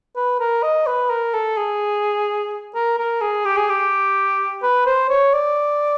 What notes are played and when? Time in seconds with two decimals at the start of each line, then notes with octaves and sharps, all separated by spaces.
0.16 B4
0.40 A#4
0.63 D#5
0.87 B4
1.10 A#4
1.34 A4
1.57 G#4
2.75 A#4
2.98 A#4
3.21 G#4
3.45 G4
3.57 G#4
3.69 G4
4.63 B4
4.86 C5
5.10 C#5
5.33 D5